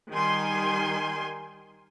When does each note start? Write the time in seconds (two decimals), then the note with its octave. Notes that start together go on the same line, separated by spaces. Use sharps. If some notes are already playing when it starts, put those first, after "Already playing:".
0.12 D#3 G3 G#5 C6